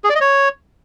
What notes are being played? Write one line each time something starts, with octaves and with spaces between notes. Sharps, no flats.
G#4
D5
D#5
C#5